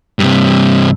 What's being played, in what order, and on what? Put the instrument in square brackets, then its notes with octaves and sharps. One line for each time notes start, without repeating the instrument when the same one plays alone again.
[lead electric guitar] G2 C3